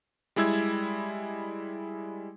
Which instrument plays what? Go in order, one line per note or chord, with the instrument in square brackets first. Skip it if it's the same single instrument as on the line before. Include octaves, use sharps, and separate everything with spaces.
[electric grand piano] G3 G#3 E4 E6 G#6